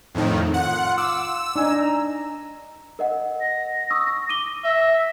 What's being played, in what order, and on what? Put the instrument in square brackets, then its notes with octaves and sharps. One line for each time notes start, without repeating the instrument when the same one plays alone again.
[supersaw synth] F2 A2 D#3
[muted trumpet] F4 [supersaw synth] F#5
[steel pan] D6 [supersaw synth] E6
[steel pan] D4 D#4 G#5 [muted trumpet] A#5
[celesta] A#4 D#5 F#5
[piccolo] A#6
[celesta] C#6 D#6 E6
D6 D#7 G7
[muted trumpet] E5 [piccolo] A#6